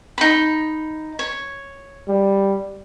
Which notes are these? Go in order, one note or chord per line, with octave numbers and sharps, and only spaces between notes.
D#4 B5
C#5
G3